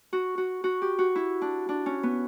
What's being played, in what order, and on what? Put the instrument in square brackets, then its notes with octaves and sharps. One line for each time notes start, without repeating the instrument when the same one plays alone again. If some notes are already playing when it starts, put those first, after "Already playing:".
[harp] F#4
F#4
F#4
G4
F#4
E4
D4
D4
C#4
B3